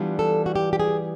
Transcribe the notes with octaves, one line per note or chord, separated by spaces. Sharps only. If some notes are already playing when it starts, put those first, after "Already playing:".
Already playing: E3 G3 B3 D4 F4
A4
F#4
G4
G4
G#4